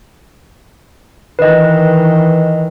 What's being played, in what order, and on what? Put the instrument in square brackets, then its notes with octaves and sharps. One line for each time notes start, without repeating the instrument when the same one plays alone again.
[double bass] D#3 E3 [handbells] B4 D#5